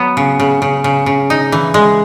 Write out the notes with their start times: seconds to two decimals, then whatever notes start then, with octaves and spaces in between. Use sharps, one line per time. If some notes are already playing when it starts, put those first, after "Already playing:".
Already playing: F#3 B3
0.17 C#3
0.40 C#3
0.62 C#3
0.84 C#3
1.06 C#3
1.30 D#4
1.52 E3
1.74 G#3